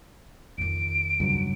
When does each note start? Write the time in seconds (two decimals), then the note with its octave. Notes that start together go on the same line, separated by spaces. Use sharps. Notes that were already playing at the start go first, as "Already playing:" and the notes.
0.58 F2 D#3 D7
1.20 C#2 G2 F#3